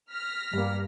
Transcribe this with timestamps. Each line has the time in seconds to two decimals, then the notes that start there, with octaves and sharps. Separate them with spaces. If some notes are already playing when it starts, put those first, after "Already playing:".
0.12 F6 A#6 B6
0.53 G2 G3 A#3